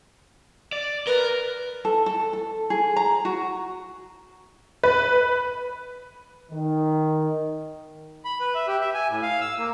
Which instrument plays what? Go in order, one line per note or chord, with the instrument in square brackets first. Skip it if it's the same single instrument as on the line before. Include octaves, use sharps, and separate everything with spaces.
[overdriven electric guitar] D5
[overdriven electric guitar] A#4 [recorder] B4
[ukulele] A4
A4
A4
G#4
A#5
F#4
[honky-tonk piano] B4
[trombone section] D#3
[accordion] B5
B4
E5
G4
E5
G#5
A2
F5
E6
A#3